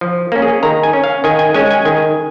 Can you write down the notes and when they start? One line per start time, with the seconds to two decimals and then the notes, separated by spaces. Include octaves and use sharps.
0.01 F3
0.32 A#3 C#4
0.42 G#4
0.63 D#3 A#5
0.83 G#5
0.93 C#4
1.04 F5
1.24 D#3 G#5
1.39 G#5
1.54 G#3 C#4 G#5
1.71 G#5
1.85 D#3 G#5